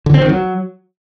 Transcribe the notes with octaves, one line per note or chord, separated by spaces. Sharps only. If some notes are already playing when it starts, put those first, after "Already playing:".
D3
C4
D#3
F#3